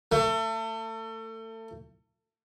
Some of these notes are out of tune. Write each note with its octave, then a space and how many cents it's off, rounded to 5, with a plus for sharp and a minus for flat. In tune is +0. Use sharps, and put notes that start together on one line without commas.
A3 +30